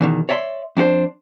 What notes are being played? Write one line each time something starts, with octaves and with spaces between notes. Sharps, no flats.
E2 B2 D#3
C#5 D5 E5 A5 C6
F2 D4 F#4 C5